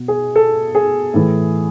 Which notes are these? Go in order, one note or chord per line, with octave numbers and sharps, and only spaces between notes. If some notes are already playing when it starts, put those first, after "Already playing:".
Already playing: B2
G#4
A4
G#4
A2 E3